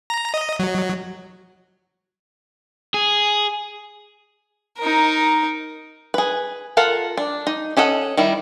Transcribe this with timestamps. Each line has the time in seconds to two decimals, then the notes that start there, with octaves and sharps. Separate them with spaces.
0.10 A#5
0.34 D#5
0.59 F#3
2.94 G#4
4.78 D#4 A#4
6.14 G#4 B4
6.77 F4 A4 A#4 F5 F#5
7.17 D4
7.47 D#4
7.77 C#4 D4 A4 D#5 F#5
8.17 D#3 G3 E4